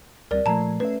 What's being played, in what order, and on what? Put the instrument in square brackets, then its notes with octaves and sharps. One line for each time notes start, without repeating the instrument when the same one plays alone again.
[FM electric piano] D2 G3 C4 [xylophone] A#4 D5
[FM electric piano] A#2 F3 A3 [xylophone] A5 A#5
[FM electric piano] A3 C#4 E5 [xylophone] B4